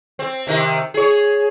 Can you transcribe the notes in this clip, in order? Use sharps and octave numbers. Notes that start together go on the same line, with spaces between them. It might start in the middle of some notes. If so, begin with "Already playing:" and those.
C4
C3 D#3
G#4 C#5